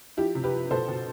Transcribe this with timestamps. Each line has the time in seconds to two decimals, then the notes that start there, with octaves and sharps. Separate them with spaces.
0.17 F3 E4 G4
0.35 C3
0.44 G4 B4
0.53 F3
0.71 B2 A4 C5
0.88 B2